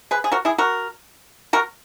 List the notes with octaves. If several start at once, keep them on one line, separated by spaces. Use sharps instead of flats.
G#4 B4
G#4
F#4 A#4
E4 G#4
F#4 A#4
F#4 A#4